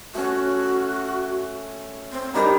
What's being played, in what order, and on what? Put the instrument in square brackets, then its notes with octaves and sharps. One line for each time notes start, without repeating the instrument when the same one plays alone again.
[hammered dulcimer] A3 C#4 [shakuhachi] F#4
[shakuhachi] C4
[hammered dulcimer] D#3 G3 A#5 [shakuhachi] D4